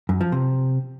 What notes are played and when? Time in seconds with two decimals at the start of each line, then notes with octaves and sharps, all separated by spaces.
0.09 F#2
0.21 F3
0.32 C3